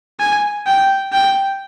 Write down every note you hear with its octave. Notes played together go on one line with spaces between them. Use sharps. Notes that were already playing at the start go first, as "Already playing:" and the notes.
G#5
G5
G5